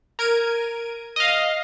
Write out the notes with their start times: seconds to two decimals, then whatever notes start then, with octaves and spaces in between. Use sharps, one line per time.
0.19 A#4 G#6 D7 D#7
1.16 D#5 F5